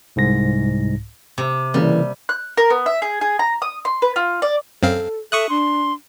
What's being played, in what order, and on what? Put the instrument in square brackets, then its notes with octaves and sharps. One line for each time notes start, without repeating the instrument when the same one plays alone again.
[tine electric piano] C2 G#2 A#6
[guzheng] C3
[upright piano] C#3 A#3 [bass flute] E3 [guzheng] G3
[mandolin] F#6
A#4
B3
E5
G#4
G#4
A#5
D#6
C6
B4
F4
D5
[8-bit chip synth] F#2 C4 F5 [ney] A4
[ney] A4 [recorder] E5 [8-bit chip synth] C#6 D#6 F#6
[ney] D4 [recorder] C6